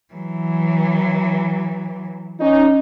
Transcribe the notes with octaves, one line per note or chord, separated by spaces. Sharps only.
E3 F#3
C#4 D#4